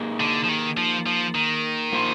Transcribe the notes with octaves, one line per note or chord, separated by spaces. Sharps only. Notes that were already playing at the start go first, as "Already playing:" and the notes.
Already playing: A#3 D#4 G#4
D3
F3
D#3
F3
F3
D#3
A#3 F4 C5